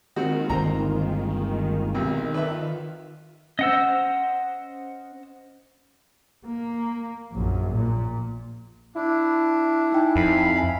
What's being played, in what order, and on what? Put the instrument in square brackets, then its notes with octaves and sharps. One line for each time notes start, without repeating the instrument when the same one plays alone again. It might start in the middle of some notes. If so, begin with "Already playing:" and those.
[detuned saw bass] D#3 [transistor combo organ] G#3 A#3 F4 [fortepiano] C4 F#4
[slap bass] G1 C2 D3 [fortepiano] C5 A#5
[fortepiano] B1 C3
[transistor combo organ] A4 D5 [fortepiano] B4 E5
[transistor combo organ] F4
[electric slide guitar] C#4 C5 [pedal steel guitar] D#5 F#5 E6
[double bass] A#3
A#1 F#2
A#2
[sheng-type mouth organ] D4 [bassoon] E4
[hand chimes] D#4 G5 G#5
[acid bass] F2 [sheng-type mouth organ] F5 B5
[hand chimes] E5 G#5